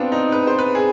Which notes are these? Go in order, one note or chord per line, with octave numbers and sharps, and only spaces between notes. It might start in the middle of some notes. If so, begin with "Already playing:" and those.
Already playing: B3 C4 D4 F4
D#4
B4
C5
B4
G#4